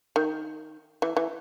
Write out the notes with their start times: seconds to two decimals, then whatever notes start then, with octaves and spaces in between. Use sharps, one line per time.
0.16 D#3
1.02 E3
1.17 E3